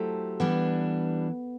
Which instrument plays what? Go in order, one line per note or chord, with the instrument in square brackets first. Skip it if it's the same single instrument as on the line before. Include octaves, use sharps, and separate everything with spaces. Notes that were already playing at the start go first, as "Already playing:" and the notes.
Already playing: [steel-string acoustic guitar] F#3 A3 E4 G4 C5 [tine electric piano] A4
[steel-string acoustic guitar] E3 G3 D4 [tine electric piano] B3